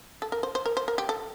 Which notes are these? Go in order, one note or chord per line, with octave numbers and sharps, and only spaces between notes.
A4
A#4
C5
C5
A#4
C5
A#4
G4
A4